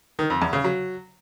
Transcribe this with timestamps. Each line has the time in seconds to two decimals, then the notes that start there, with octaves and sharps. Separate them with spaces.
0.19 D#3
0.30 F2
0.42 E2
0.53 C#3
0.64 F#3